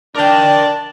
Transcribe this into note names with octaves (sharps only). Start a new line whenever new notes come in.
D4 A#4 D5 G5 A5